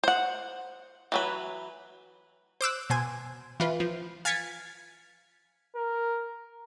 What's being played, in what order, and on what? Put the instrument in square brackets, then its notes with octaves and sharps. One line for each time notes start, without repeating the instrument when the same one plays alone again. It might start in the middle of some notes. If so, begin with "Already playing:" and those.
[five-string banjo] C5 F#5
E3 F#3 B4
[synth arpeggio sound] C5 D6 E6 F#6
B2 C5 G#5
E3 F4 B4
F3
F5 G#5 G#6 A6 B6 C#7
[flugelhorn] A#4